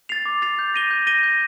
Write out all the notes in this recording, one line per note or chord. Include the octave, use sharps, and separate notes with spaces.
A6 C7 F7
D6
A6 C7 F7
G6
A#6 D#7 G7
G6
A#6 D#7 G7
G6